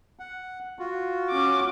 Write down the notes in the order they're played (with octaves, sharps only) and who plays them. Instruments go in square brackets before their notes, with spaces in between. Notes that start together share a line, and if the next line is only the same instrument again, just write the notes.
[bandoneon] F#5
F4 F#4
[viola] C#4 D6